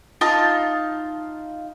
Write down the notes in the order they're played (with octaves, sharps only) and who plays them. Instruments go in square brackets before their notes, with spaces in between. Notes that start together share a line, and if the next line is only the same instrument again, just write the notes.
[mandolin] D#4 F4 F5 A5